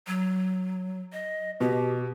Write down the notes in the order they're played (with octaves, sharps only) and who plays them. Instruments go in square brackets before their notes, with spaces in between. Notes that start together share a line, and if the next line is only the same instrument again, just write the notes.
[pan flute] F#3
D#5
[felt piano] B2 [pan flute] G4